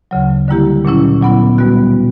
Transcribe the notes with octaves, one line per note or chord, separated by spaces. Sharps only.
D2 C#3 F#3
D3 G3 A#3 E4 G4
A#2 F#3 C#4 E4
A#2 F#3 B3 E4
B2 G3 B3 F#4